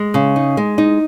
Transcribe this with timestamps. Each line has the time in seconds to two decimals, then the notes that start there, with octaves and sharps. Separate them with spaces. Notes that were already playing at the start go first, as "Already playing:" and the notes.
Already playing: G#3
0.14 C#3
0.36 D#4
0.57 G#3
0.78 D#4